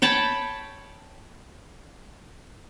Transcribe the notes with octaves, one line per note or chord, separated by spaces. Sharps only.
C#5 G5 A5 B5